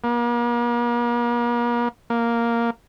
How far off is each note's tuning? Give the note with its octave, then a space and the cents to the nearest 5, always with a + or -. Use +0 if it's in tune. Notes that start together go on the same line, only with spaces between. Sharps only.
A#3 +40
A#3 +0